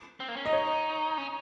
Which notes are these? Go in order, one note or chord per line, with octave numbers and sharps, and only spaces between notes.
C4
A#3
C#4
D#4 D#5
C#5
C#4